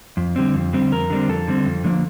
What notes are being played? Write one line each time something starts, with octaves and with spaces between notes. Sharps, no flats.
F2
D3 G3 C4
F2
D3 G3 C4
F2 A#4
D3 G3 C4
F2 A4
D3 G3 C4
F2
D3 F3 A#3